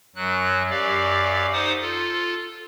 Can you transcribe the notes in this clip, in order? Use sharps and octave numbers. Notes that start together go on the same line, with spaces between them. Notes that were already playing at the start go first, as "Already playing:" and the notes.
F#2 F#3 F#6
F#2 G4 D5 F5
D#4 C5 F#5 D6 D#6
F4 A4